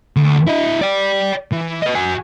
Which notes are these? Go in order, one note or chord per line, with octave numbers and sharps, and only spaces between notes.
D2
E4 D#5
D5 G5
E3
B4 D#5
F#4 G#5